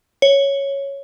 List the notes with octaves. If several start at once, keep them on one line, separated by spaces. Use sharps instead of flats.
C#5